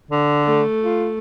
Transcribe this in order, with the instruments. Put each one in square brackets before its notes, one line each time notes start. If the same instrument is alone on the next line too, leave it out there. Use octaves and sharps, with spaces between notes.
[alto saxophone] D3
[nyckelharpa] A3
[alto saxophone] F4